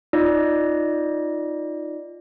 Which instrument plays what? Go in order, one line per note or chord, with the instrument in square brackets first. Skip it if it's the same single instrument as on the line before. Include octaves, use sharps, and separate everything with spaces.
[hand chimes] D#4 F4 D5 A#6